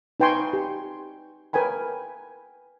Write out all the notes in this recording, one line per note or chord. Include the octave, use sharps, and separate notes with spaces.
D#4 B4 G5 G#5 C6 C#6
G4
A#4 B4 G5 G#5 B5